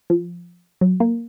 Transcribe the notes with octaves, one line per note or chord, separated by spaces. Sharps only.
F3
F#3
A#3